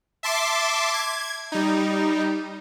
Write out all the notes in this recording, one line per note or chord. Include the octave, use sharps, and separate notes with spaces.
E5 A5 C6 D6
G#6
G3 D#4